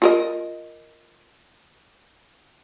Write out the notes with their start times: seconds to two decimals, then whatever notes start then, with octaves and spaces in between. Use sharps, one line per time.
0.02 F4 A#4 D#5